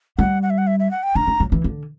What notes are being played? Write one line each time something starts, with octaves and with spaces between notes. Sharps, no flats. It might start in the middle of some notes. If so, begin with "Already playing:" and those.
G3 F#5
F#5
E5
F#5
E5
E5
F#5
G5
D4 A#5
D4
F#3
E3
D3